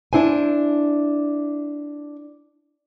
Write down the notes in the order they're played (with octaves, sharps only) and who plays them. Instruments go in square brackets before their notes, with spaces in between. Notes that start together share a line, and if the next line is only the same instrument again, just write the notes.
[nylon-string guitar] D4 E4 C5 G#5